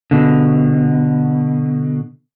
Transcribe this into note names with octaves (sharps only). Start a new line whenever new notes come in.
B2 D3